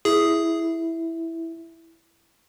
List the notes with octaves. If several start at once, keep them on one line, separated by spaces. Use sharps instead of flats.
E4 G#4